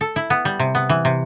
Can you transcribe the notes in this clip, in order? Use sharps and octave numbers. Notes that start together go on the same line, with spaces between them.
A4
E4
B3
G3
C3
B3
E3
C3